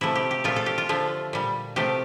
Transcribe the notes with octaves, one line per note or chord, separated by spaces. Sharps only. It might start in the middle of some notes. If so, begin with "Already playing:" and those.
C3 F3 A3 E4
G4
G4
A#2 F3 A3 F4
A4
G4
F4
D3 F3 A3
A#2 G3
C3 F3 A3 G4